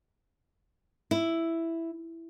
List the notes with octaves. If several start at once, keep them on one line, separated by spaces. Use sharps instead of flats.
E4